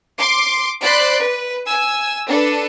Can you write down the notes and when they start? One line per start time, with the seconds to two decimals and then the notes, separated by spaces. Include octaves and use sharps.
0.20 C6 D6
0.82 C5 D5 B5 C6 F#6
1.20 B4
1.69 G#5 E6
2.28 D4 A4 B4